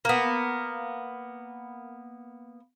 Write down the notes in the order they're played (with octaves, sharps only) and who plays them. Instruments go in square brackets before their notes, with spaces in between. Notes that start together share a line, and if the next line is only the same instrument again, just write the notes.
[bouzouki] A#3 B3